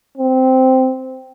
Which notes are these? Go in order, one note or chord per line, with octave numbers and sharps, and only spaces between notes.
C4